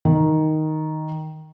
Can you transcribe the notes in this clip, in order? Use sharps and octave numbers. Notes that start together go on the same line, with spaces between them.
D#3